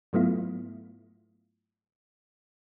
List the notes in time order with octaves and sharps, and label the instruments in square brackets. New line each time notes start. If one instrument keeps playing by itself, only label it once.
[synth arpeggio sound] G#2 F#3 A3 B3 E4 F4